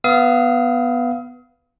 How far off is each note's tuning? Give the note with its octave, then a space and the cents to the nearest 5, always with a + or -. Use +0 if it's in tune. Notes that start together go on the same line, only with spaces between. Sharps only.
B3 +0 F5 -20 D#6 +35